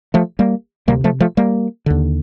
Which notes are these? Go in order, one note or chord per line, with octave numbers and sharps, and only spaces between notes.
F3 A3
G3 A#3
D2 C3 G3 A#3
F3 A3
F3 A3
G3 A#3
D#2 D3